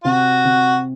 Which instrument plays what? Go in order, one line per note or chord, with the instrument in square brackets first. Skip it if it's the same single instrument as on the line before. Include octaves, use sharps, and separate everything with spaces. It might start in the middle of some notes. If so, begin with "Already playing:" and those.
[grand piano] C3 [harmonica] F#4
[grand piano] C3